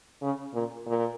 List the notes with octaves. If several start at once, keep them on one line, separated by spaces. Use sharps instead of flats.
C#3
A#2
A#2